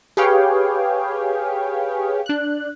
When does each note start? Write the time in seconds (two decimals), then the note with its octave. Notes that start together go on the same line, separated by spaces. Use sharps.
0.17 G4 G#4 B4 C#5 F5 G5
2.26 D4 F#6